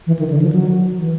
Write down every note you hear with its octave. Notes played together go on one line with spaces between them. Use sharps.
E3
D#3
D3
F3
F#3
E3